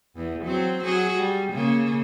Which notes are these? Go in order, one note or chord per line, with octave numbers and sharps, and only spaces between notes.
E2
F#3 C4
F#3 F#4 G#4
G3
C#3 A#3